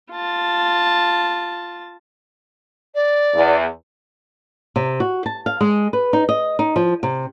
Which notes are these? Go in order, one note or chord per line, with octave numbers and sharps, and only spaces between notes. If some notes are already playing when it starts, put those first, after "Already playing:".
F4 A5
D5
E2
C3
F#4
A5
F5
G#3
B4
D#4
D#5
D#4
F3
C3